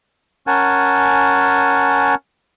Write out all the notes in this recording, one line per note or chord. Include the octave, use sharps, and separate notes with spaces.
C#4 A#4 F#5 G#5 A5